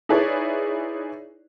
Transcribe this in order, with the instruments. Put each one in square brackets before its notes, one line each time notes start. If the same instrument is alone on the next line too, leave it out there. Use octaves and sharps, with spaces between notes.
[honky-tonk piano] D#4 E4 G#4 B4 C#5 D5